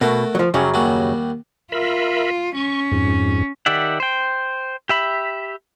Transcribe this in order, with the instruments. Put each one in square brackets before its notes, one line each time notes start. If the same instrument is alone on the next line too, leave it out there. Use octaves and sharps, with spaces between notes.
[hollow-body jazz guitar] B2 [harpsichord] A3 F#4 A#4
[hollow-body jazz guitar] F3 F#3
[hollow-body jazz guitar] F#2 C#3 F#3 [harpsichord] G3
[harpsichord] D#2 G3 F#4
[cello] F4 [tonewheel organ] A#4 E5 B5
[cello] C#4 [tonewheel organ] C#6
[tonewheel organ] F2 G#2
[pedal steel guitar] D#3 G4 D5 E5 F#5
C5 G5
G4 E5 B5